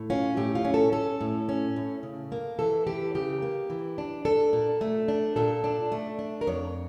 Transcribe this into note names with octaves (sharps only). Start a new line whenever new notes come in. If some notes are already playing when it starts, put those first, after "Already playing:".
Already playing: A2
C#4 F4
A2 G4
F4
C#4
A4
C#4 A4
A2
C#4
A2
C#3
A#3
E3 A4
E3 G4
C#3 G4
A#3
E3
D4
D4 A4
A#2
A3
D4
A#2 A4
D4
A3
D4
A#4
F2 C#5